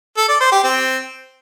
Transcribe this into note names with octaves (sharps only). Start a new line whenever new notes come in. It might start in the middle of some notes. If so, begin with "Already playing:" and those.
A4
D5
C5
G4
C4